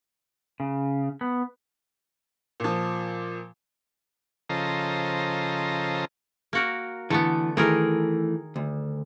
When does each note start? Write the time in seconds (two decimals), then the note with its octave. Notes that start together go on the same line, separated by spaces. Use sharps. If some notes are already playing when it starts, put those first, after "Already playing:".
0.60 C#3
1.21 B3
2.60 A#2 F3
4.49 C#3 F3 A4 C5 D#5 A#5
6.53 A#3 F#4 A#4
7.10 D3 E3 A3 B3
7.57 D#3 E3 A3 G#4 A#4
8.56 D2